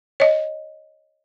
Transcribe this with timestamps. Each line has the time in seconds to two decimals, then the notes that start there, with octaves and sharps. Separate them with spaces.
0.20 C#5 D#5